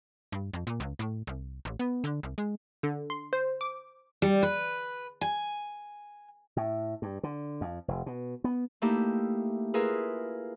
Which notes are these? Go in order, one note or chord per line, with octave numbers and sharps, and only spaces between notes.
G2
F2
A#2
C#2
A2
C2
A1
B3
D3
C2
G#3
D3
C6
C5
D6
G3
B4
G#5
A2
G2
D3
F2
F1
B2
B3
A3 A#3 D#4 E4 G4
E4 F4 G#4 A#4 B4